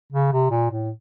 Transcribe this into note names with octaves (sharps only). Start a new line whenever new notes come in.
C#3
C3
A#2
A2